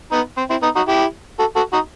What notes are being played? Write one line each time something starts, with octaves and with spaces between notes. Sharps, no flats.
B3 D#4
C4
C4 E4
B3 D#4
D#4 F#4
E4 G4
F#4 A4
F#4 A4
D#4 F#4